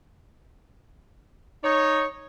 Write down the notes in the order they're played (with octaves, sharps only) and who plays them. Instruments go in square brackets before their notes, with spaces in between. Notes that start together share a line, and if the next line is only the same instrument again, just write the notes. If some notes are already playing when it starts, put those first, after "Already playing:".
[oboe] D#4 [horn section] C#5